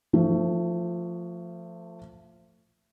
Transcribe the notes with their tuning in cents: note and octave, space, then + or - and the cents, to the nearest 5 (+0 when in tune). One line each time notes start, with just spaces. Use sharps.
F3 +0 A3 +25